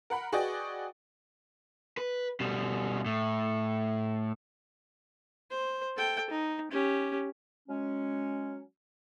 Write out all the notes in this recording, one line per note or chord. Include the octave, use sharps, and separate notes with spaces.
A#4 F#5 B5
F#4 G#4 B4 D5 D#5 G5
B4
B2 G3
A2
C5
A4 G5
D#4
C#4 G4
F#3 G#3 C#4